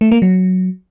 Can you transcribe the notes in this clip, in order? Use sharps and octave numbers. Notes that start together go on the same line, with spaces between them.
A3
A#3
F#3